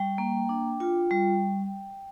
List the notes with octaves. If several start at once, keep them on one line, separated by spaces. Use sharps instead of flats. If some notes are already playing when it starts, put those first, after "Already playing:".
Already playing: G3 G5
A#3
D4
F4
G3